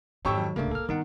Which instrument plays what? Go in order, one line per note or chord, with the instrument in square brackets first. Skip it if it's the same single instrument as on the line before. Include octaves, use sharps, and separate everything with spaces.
[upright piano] F2 G4 C#6 [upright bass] G#2 D#3 [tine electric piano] C#5 E6
[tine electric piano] F#3
[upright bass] D1 C2 [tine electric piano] C#3 A3 D4 [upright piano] A#3
[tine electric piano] A4 F6
[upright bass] G2 B3 [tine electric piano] D#3 D#4 F#5